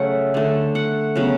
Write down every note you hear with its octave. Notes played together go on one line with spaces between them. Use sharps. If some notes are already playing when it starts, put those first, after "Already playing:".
Already playing: C#3 F#3 A3 E5 F#5
D3 A3
F#5
C#3 F#3 B3